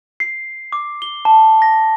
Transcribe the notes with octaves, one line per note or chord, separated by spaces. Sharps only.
C7
D6
G7
A5
A#6